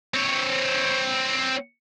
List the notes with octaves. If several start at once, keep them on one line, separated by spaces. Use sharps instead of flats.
C4 C#5